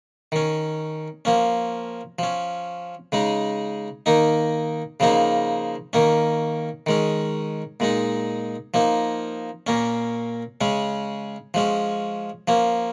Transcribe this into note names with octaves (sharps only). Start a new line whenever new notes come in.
D#3 C#4
F3 A#3 C#4
F3 C#4
C#3 G#3 D#4
D#3 A#3 D#4
C#3 F3 A#3 D#4
D#3 A#3 C#4
D#3 G#3 C#4
A#2 G#3 D#4
F3 A#3 D#4
A#2 A#3 C#4
C#3 G#3 C#4
F3 G#3 C#4
F3 A#3 C#4